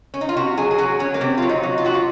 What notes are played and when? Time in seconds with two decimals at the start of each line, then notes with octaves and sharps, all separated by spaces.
0.14 C#4
0.21 D#4
0.29 F4
0.36 C3 F#4
0.57 F#3 G#4
0.71 G#4
0.78 F#3 F#4
0.99 F#3 C#4
1.14 A#3
1.21 C3 C4
1.38 F#3 F4
1.49 D#4
1.63 F#3
1.78 F4
1.84 C3 F#4
1.94 F4